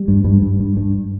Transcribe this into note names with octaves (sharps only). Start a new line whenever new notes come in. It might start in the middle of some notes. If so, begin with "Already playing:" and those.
Already playing: G3
G2
G2
G2
G2
G2